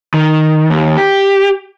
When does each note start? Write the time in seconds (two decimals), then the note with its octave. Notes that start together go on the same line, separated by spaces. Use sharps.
0.14 D#3
0.70 D#2
0.97 G4